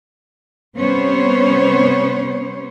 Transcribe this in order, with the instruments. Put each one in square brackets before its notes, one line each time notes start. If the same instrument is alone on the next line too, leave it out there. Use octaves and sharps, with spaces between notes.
[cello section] C3 G3 B3 C#4 C5 C#5